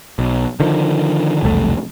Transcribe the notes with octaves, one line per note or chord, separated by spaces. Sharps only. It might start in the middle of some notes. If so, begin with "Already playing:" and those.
B1
D3 D#3 F3
E1 C2 F2 A3